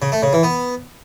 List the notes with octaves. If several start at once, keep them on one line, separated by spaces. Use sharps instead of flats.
C#3
A3
C#3
E3
B3